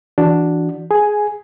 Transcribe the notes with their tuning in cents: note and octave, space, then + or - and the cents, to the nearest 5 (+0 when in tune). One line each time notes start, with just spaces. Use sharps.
E3 +10 D4 +0 F#4 +0
G#4 +10 G#5 +0